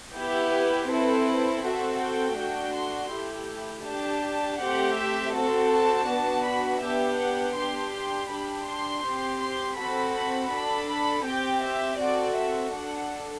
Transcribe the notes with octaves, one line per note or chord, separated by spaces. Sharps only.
B3 E4 G4
B4
C4 E4 A4 B4
C4 F#4 A4 E5
G5
A3 D4 F#4
C6
A3 E4 G4
D4 G4 A5
A3 C4 G4 F#5
E5
C4 F#4 A4
A5
B3 D4 F#4
B5
B3 D4 G4 E5
F#5
D4 G4 C6
C6
D4 G4 B5
C6
C4 G4
C6
C4 F#4 A4 B5
B5
D4 A4 B5
B5
C4 G4 G5
E5
C4 F#4 A4 D5
E5
D4 A4 F#5